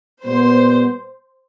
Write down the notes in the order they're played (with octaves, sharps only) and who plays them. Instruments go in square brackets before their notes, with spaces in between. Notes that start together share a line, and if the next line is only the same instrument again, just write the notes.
[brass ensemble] A#2 G3 B3 [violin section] C5